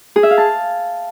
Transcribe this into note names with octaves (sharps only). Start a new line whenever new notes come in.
G#4
E5
F5
A5